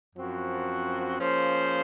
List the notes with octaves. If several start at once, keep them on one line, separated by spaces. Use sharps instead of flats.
F#2 F3 C4 F#4
F3 A#3 C#4 G#4 C5